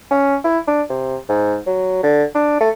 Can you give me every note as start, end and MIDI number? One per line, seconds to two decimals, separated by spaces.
0.11 0.36 61
0.44 0.59 64
0.67 0.82 62
0.90 1.16 48
1.29 1.57 44
1.66 2.01 54
2.03 2.23 50
2.35 2.57 62
2.60 2.69 57